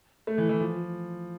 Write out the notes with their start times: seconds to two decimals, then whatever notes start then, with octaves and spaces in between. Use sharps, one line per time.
0.27 A3
0.38 E3
0.49 E3
0.60 F3